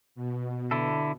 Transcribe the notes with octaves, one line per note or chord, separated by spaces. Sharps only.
B2
D3 E4 A4